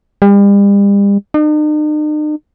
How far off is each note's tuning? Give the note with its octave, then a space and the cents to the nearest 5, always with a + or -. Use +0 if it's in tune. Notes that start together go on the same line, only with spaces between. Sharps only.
G3 +40
D#4 -45